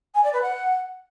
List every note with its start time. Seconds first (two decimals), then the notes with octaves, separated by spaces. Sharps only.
0.15 G#5
0.24 D5
0.33 B4
0.42 F#5